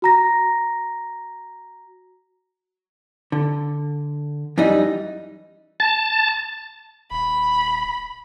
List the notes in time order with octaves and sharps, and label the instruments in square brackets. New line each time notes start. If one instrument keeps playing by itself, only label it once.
[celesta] F#4 A#5 A#6
[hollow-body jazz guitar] D3
F#2 E3 G3 D#4
[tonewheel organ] A5
[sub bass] D#1 [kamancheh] B5